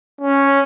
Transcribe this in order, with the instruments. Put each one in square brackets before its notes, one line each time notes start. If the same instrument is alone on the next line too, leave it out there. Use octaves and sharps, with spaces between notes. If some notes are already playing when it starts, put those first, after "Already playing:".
[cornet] C#4